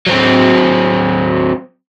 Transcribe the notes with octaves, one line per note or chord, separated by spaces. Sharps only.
F#3 C4